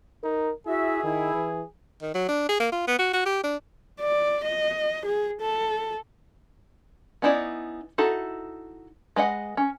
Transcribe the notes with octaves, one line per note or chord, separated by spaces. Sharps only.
D#4 A#4
E4 F#4 G#4 E5
D#3 E4
E3
D#3
F#3
D4
G#4
A#3
F4
B3
F#4
F#4
G4
D4
D5
D#5
G#4
A4
B3 C#4 D#4 E4 D5
D#4 E4 F#4 A4
G#3 B4 D#5 F#5
C#4